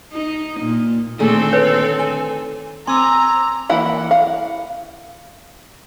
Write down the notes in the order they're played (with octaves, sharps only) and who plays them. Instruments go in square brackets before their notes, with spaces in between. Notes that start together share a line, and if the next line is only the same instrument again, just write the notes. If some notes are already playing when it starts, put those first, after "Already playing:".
[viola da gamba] D#4
A#2
[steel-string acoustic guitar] A#2 A3 G#4 [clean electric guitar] D3 D#3 [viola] C4 A4
[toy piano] B4 C#5
[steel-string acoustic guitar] G#5
[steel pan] C4 G#5 [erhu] A#5 [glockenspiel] C6 D6 E6
[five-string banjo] E3 A#3 E4 F#5 B5
F5 F#5